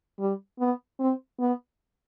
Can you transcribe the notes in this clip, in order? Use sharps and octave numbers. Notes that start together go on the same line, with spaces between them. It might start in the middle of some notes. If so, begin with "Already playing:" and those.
G3
B3
C4
B3